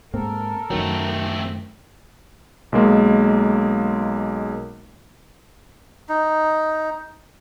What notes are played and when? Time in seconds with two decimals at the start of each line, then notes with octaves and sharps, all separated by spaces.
0.14 G#2 A#3 C4 A4 A#4
0.70 F#2 D#3 F#3 A3 C4
2.72 B1 G#3 A#3
6.09 D#4